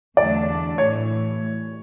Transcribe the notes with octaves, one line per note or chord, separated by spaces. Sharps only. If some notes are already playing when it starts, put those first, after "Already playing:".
E2 D3 F#3 A3 D4 D5
A2 E3 A3 C#5